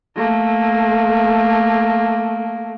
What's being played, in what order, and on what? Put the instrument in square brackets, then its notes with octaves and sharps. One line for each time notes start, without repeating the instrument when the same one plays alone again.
[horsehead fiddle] A3 A#3